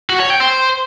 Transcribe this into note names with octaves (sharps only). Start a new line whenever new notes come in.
F#4
C#5
G5
C5